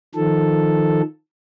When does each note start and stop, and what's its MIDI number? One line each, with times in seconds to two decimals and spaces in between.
0.15 1.02 51
0.15 1.02 53
0.15 1.02 69